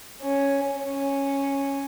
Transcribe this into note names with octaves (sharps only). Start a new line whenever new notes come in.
C#4
C#4